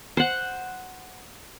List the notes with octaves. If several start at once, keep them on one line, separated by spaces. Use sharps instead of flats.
C5 F#5